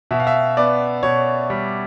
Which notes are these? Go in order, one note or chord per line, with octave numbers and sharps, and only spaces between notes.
B2 E5
F5
E5
B3 D5
B2 C#5
G3